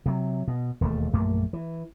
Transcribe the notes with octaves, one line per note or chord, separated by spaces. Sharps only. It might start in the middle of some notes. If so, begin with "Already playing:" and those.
C3 F#3
B2
E1 D#2 E3 A3
A#1 F#2 A3 A#3
E3